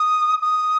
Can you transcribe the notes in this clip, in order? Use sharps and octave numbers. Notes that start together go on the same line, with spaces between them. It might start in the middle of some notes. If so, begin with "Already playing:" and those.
Already playing: D#6
D#6